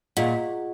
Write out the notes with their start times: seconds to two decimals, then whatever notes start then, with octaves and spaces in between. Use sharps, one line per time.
0.17 A#2 F4 G#4 D#5 F#5